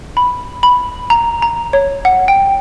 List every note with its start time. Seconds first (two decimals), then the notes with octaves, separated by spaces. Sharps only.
0.17 B5
0.63 B5
1.10 A#5
1.42 A#5
1.73 C#5
2.05 F#5
2.28 G5